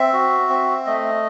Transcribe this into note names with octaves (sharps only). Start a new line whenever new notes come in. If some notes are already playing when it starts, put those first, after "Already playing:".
Already playing: C4 E5
F#4
C4
A3 D#5